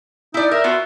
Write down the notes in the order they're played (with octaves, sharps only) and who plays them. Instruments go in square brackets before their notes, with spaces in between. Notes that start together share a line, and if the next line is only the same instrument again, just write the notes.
[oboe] D#4 [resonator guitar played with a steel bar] E4 D5
[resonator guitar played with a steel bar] A#4 [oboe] E5
[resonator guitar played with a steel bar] B3 F4 F#4